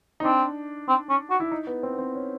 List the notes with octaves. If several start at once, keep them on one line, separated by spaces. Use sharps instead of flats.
D#4
C4 D4
C4
C#4
F#4
E4
D#4
B3
C4
B3
C4
C#4